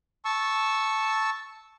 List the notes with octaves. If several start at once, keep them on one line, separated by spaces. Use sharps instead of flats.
A5 C#6 E6